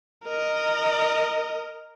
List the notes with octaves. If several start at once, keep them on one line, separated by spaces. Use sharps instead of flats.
A#4 D#5